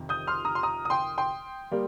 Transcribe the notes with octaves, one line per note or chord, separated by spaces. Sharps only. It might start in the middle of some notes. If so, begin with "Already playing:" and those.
Already playing: F2 C3 D#3
D#6 G6
C6 F6
A#5 D#6
C6
A#5 D#6
D#6
G5 C6
G5 C6
G3 A#3